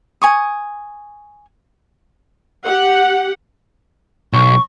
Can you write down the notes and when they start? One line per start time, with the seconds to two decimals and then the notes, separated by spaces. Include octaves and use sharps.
0.22 G#5 C#6 D#6
2.64 G4 F#5
4.33 B1 C#6